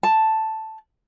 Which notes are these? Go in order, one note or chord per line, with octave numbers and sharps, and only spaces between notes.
A5